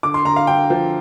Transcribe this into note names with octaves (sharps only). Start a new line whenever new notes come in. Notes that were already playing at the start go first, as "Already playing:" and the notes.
D3 D6
C6
D3 A#5
F5
D3 G5
F3